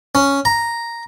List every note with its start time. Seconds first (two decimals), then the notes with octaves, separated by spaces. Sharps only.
0.15 C#4
0.45 A#5